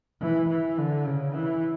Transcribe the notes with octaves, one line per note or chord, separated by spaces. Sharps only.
E3
E3
D3
C#3
E3